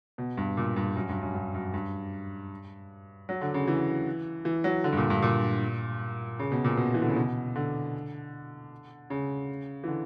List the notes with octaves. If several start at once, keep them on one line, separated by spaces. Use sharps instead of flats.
B2
G2
A#2
G2
F#2
G2
F#2
G2
F#2
G2
F#3
D3
C#3
E3
E3
F#3
D3
G2
A#2
G2
A#2
C#3
B2
A#2
B2
E3
D3
C#3
B2
D3
C#3
E3
D3